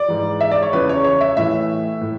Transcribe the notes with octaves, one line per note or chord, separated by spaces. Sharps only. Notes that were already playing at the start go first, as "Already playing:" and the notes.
Already playing: D5
G#2 E3
E5
D5
C#5
E2 C#3 E3 B4
C#5
C#5
E5
A2 E3 E5
A2